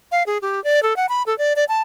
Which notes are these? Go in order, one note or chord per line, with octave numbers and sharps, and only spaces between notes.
F5
G#4
G4
D5
A4
F#5
B5
A4
D5
D5
A5